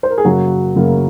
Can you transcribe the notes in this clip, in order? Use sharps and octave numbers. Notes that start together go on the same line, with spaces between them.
C5
A#4
G#4
F#2 C#3 F#3 A#3 F#4
F#2 C#3 F#3 A#3